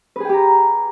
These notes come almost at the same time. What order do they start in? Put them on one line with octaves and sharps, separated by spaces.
B4 G#4 G5 G4 A#5